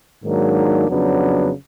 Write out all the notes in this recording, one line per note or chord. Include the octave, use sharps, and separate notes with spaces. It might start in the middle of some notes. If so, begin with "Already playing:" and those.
G#2 D#3 F#3 A#3 D4
F2 C#3 F#3 B3 D4